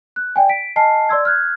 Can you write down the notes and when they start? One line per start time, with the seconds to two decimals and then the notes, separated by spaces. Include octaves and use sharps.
0.16 F#6
0.36 D5 G5 G#5
0.49 B6 D7
0.76 D#5 G#5 A5 F6 C7
1.09 D5 C6 E6 G#6
1.25 F6 F#6 G#6